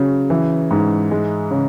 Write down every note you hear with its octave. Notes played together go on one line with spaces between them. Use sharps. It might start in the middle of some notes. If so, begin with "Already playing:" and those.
Already playing: C#3 F#3
E3
G#2
G#3
C#3